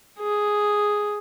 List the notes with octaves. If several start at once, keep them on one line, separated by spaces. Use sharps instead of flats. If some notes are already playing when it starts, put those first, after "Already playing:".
G#4